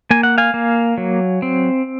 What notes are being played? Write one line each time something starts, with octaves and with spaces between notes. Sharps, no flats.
A#3 G#5
F#5
F5 G#5
A#3
F#3
C4